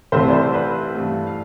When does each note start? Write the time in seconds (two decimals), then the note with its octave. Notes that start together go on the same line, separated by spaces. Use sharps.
0.12 C2 C3 E3 A3 C5 E5
0.28 D5
0.33 C5 E5
0.53 B4 D5
0.95 G2 E3 A3
1.27 F5